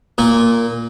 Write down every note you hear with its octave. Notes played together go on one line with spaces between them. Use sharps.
A#2 A#3